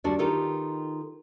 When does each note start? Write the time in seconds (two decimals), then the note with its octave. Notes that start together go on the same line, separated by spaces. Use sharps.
0.04 D2 G3 D4 F#4 D5
0.19 D#3 D#4 F4 G4 A4 B4